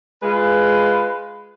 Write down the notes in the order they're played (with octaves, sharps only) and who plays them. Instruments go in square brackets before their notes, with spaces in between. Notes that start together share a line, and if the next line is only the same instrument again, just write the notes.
[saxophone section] G#3 F4 B4